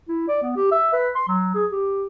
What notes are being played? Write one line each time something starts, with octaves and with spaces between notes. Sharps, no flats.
E4
D5
B3
G4
E5
B4
C6
F#3
G#4
G4